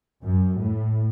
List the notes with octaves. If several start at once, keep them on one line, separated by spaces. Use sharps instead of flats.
F#2
A2